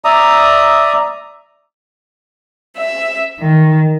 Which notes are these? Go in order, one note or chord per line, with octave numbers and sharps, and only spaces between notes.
D5 E5 A#5 D#6
E5
D#3